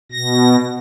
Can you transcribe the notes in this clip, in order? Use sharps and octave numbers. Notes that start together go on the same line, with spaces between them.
B2 A#6